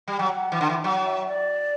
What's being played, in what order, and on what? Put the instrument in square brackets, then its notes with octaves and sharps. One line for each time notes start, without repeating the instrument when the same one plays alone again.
[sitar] G3
[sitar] F#3 [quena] F#5
[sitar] E3
D3
E3
[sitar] F#3 [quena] F#5
[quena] E5
D5